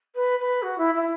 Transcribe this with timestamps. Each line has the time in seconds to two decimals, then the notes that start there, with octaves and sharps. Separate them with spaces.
0.15 B4
0.39 B4
0.62 F#4
0.78 E4
0.94 E4